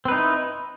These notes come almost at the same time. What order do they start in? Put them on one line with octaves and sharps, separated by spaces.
C4 B4 D#4 E4